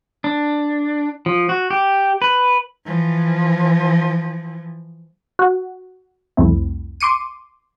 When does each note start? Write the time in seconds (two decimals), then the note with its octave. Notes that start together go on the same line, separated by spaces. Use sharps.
0.24 D4
1.26 F3
1.49 F#4
1.70 G4
2.22 B4
2.85 E3 F3
5.39 F#4
6.37 C2 F2 A3 C4 E4
7.00 C6 D6 C#7 D#7